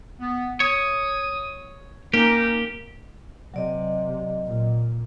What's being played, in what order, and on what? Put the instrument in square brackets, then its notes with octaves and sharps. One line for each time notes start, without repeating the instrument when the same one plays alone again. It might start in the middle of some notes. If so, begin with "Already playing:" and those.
[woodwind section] B3
[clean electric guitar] C#5 [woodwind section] D#6
[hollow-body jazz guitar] A#3 [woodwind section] C#4 D#4 [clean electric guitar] G4
[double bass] C3 [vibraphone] F#3 D5 D#5
[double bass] A#2